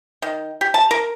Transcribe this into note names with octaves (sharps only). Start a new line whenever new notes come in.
D#3
G4
A5
A#4